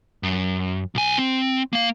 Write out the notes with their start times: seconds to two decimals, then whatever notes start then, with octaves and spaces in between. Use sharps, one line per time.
0.23 F#2
0.95 B1 G#5
1.18 C4
1.73 A#3 F5